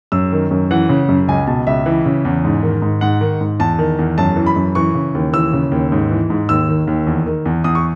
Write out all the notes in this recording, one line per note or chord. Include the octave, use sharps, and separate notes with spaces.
F#2 E6
D#3
F#2
E3 F#5
C#3
F#2
C#2 G#5
B2 A5
C#2 E5
E3
C#3
E2
G#2
D#3
G#2
G#2 F#5
D#3
G#2
E2 A5
D#3
E2
F#2 A5
E3
B5
F#2
E3 C#6
C#3
D#2
E3 E6
C#3
D#2
G#2
E3
G#2
D#2 E6
D#3
D#2
E2
D#3
E2
E2 D#6
C#6